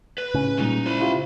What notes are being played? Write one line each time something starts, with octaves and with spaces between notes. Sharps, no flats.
B4
A2 C#3
A#2 G3 G#3 D#4
E4 C5 B5
E4 F4 G4